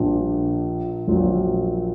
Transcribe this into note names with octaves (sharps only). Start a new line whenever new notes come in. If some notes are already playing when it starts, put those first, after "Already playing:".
Already playing: A#1 A#2 G3 D4
A#1 A#2 F#3